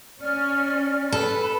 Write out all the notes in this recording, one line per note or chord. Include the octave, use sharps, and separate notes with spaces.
C#4 D5 F6
A4 B4